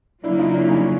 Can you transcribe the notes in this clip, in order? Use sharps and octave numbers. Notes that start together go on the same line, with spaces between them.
C#3 F#3 A#3 D4 E4
D#4 F4
D4 E4
C#4 D#4